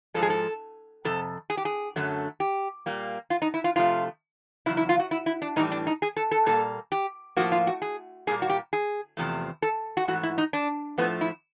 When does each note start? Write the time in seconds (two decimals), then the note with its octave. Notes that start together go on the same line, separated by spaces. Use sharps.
0.14 G#2 F3 G#3 A4
0.22 G#4
0.30 A4
1.05 F2 C3 A4
1.50 G#4
1.57 G4
1.65 G#4
1.96 F#2 D3 F#3 A3
2.40 G4
2.86 A#2 G3 A#3
3.30 F4
3.42 D#4
3.54 E4
3.64 F4
3.76 C3 F3 A3 F4
4.66 E2 C#3 F#3 E4
4.77 E4
4.89 F4
5.00 F#4
5.11 E4
5.26 E4
5.42 D4
5.56 A2 E3 G3 D#4
5.72 D4
5.87 D#4
6.02 G#4
6.17 A4
6.31 A4
6.46 A#2 G3 A#3 A4
6.92 G4
7.37 A2 F3 A#3 F#4
7.52 F4
7.67 F#4
7.82 G#4
8.27 A#2 G3 A#3 G#4
8.42 F#4
8.50 G4
8.73 G#4
9.17 E2 C3 F3 A3
9.62 A4
9.97 F#4
10.08 G#2 E3 A3 F#4
10.23 E4
10.38 D#4
10.53 D4
10.98 A2 F3 A3 B3
11.21 E4